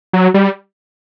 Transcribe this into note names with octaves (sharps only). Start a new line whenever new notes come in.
F#3
G3